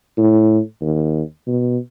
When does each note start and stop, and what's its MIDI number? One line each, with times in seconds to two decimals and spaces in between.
0.18 0.59 45
0.81 1.22 39
1.47 1.78 47